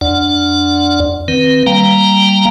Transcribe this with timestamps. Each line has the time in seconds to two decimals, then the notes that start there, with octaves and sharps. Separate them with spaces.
0.01 F2 D4 D5 F#5
1.28 D#3 C4 B4
1.66 G3 A#3 F5 G5 A#5